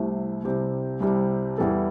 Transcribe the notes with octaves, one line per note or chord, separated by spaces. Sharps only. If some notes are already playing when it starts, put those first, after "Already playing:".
Already playing: C2 C3 A3 E4
C2 C3 G3 C4 G4
C2 C3 G3 C4 G4
E2 E3 G3 E4 A4